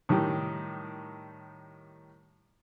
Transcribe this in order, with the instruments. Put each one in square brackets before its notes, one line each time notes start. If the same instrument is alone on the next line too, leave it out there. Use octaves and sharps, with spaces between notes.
[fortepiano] A2 D#3 G3 G4